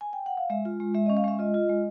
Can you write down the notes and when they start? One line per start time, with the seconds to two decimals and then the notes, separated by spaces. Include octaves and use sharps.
0.01 G#5
0.13 G5
0.26 F#5
0.37 F5
0.50 G#3 E5
0.65 F4
0.80 G#3
0.94 G#3 E5
1.06 D#5
1.10 C#4
1.17 F5
1.24 G#3 E5
1.39 F4 D#5
1.54 F4
1.69 G#3